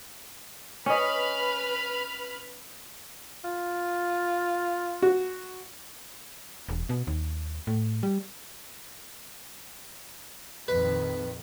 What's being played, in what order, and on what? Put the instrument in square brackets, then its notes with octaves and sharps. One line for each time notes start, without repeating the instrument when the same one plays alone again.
[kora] C#4 D#5 [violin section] B4 B5 F6
[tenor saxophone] F4
[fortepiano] F#4
[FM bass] E1
B2
D#2
A2
G3
[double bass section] A#1 F2 D#3 [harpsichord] B4